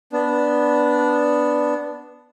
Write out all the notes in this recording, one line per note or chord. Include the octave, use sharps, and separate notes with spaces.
B3 D4